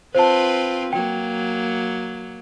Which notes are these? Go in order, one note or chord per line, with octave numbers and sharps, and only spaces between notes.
C4 F4 B4 C5 A5
F#3 A#3 G5